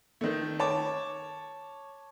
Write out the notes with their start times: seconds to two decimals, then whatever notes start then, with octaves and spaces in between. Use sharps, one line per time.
0.21 D#3 A3
0.60 C#5 A5 D6